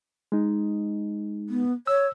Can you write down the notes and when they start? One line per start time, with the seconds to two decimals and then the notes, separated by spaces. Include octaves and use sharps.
0.32 G#3 D#4
1.49 B3
1.87 C#5 E6